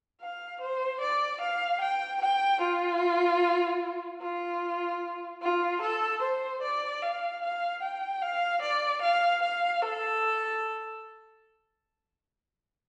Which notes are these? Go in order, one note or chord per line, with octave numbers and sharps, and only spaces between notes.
F5
C5
D5
F5
G5
G5
F4
F4
F4
A4
C5
D5
F5
F5
G5
F5
D5
F5
F5
A4